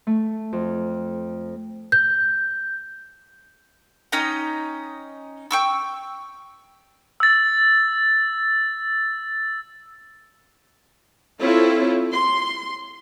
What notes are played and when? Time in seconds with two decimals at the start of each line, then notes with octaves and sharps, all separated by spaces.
0.07 A3
0.53 F2
1.92 G6
4.12 C#4 D#4 G5 A#5
5.51 G5 C#6 E6
7.20 E6 A6
11.41 C4 E4 F4 A4 C#5
12.12 C6